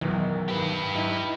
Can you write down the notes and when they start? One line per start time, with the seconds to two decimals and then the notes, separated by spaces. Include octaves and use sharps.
0.01 B1 E2 D#3
0.48 G4 B4
0.95 D#4 E4